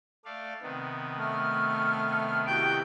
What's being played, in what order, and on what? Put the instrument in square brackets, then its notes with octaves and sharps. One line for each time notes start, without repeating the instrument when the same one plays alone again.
[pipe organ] A3 D5 F5
C3 D#3 B3
[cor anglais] A3 [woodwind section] F6
[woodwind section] E4 F#4 G4 [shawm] G5